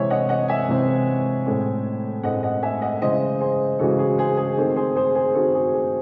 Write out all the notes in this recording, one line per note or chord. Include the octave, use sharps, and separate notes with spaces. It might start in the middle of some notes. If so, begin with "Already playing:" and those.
Already playing: C3 E3 G#3 C4 C#5 E5
D#5 F#5
D#5 F#5
E5 G#5
C3 E3 G#3 C4
A2 G#3 C4
A2 G#3 C4 D#5 F#5
D#5 F#5
E5 G#5
D#5 F#5
C#3 E3 G#3 C5 D#5
G#4 C5
C#3 E3 G#3 F#4 A4
G#4
G#4 C5
G#4
D#3 A3 C4
G#4 C5
G#4 C5
G#4 C5
D#3 A3 C4 F#4 A4
G#4
G#4